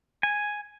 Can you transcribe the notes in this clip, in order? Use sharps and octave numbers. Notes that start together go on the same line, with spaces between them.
G#5